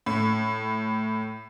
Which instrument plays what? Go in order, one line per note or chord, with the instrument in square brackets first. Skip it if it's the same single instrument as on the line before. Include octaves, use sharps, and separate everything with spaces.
[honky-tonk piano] A2